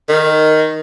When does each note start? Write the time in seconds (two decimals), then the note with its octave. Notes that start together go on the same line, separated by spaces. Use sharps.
0.09 D#3